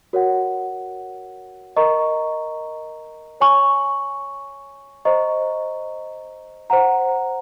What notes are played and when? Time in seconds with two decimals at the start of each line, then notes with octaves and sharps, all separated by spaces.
0.13 F#4 A#4 C#5 F#5
1.76 A#4 D#5 A#5 C#6
3.40 C#5 G#5 C#6
5.05 C5 D#5 A#5 C#6
6.70 C5 F#5 A#5